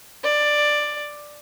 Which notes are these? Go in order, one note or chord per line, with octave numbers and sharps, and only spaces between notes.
D5